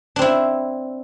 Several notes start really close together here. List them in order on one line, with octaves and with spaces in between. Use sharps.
D4 C4 E4